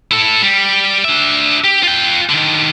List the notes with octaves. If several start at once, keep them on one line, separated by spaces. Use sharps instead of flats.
E4 A4
G3
D4 E5
G4
F4 G5
D3 D#3